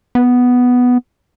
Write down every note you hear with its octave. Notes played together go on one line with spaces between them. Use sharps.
B3